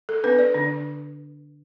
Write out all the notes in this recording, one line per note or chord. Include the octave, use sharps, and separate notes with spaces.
A4
B3 D4 B4
D5
D3 D4